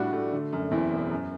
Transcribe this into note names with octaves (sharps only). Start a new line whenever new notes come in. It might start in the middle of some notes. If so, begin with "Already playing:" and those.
Already playing: A2 G3 D4 F#4
A3
D3
F#2
E2 C4 E4
E1
F#2